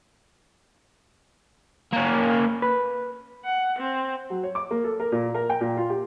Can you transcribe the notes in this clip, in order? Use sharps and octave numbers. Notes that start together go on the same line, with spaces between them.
A#3 C#4
B4
F#5
C4
F#3
C#5
D6
A#3
A4
A#4
A#2
A#4
G5
A#2
F4
G4